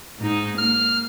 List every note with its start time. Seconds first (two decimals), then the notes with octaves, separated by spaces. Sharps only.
0.19 G#2 D#4
0.58 A#3 F6